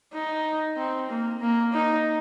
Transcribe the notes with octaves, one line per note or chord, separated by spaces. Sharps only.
D#4
C4
A#3
A#3
D#4